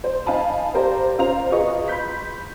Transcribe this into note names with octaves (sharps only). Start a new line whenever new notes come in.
C5
D#4 F5 G#5 A5 B5
G4 A#4 C5 D5 F5
C#4 F4 C5 F5 A#5 F7
F4 F#4 G#4 B4 D#5 C#6
B5 C6 G6 B6